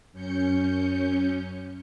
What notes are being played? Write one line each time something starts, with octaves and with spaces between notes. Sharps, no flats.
F#2 C#4 G6 C#7